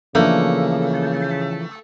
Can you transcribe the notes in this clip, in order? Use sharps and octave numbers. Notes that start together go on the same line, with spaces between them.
C#3 E3 F3 A3 A#3 D4